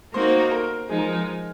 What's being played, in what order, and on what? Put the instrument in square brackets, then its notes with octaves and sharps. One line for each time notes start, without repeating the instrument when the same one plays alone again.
[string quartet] A#3 D#4 F#4 A#4 [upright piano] C5
[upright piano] A#4
[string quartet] F3 G#3 D#4 [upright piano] G#4
[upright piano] A#4